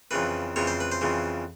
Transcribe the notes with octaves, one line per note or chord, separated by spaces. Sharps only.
F2 C#3 E3 B4
F2 C#3 E3 C#5
C5
B4
C5
F2 C#3 E3